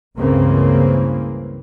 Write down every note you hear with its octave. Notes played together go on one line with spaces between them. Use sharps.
C#2 G2 C#3 E3 A#3 C4